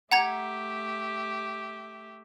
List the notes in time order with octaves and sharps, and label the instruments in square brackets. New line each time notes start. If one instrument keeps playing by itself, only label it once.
[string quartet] A3 G4 E5 [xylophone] F#5 A#5 G#6